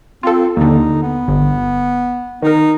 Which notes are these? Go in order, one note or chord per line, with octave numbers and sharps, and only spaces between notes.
C4 F4 A4
D#2 D3 D#4
B3
G1
D#3 D#4 A#4